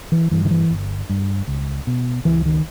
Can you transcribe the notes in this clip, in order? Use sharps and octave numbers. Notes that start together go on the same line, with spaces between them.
E3
G2 E3
D#3
E3
G1
G2
C#2
B2
C#2 E3
D#3